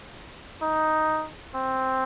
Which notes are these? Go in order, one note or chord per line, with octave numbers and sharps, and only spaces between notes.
D#4
C4